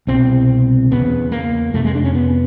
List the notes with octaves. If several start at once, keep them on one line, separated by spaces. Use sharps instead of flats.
C2 B2 C4
E2 C#3 B3
A#3
F2 C3 A3
G#3
D4
C#4
B3